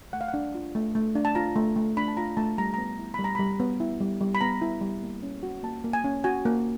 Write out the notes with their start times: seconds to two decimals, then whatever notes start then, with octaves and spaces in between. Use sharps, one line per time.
0.13 A3 F#5
0.21 F5
0.28 F#5
0.34 D4
0.55 F4
0.75 A3
0.95 A3
1.15 D4
1.25 A5
1.35 F4 A#5
1.56 A3
1.76 A3
1.97 D4 B5
2.08 A5
2.17 F4 A#5
2.37 A3 A5
2.58 G3 A#5
2.74 A#5
2.78 B3
2.99 E4
3.14 G3 B5
3.24 A#5
3.35 G3 B5
3.60 B3
3.80 E4
4.00 G3
4.21 G3
4.35 B5
4.41 B3 A#5
4.62 E4
4.81 G3
5.02 A#3
5.23 C#4
5.43 F#4
5.63 A#3 A5
5.84 A#3
5.93 G#5
6.04 C#4
6.24 F#4 G#5
6.45 A#3